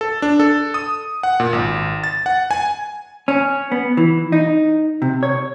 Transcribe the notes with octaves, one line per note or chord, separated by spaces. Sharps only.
A4
D4
A4
D#6
F#5
A#2
G#1
A6
F#5
G#5
C#4
B3
E3
D#4
C3
C#5